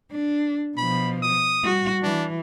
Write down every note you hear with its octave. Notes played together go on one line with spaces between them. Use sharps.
D4
B2 F3 B5
D#6
G3 F#4
E3 D4